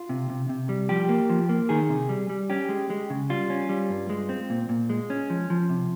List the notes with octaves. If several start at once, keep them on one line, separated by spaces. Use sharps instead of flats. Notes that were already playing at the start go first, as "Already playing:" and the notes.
Already playing: F4
C3
C3
C3
G3
F3 G4
A#3
F3
A#3
D#3 G#4
C3
G3
G3
C#4 G4
G#3
G#3
C#3
G3 F4
C#4
G3
G2
G#3
C4
A#2
A#2
G#3
C#4
F3
F3
C3